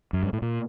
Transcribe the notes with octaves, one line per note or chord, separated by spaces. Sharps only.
F#2
G2
A2
A#2